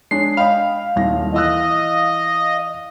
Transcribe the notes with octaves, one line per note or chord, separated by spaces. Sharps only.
G#3 D4 C#5 C7
D#5 F5 G5 B5
D#1 C2 A#6
E3 D#5 E6 F#6